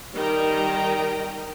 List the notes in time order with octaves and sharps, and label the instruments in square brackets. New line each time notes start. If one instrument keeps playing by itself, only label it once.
[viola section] D#3 G3 D#5 G5 A#5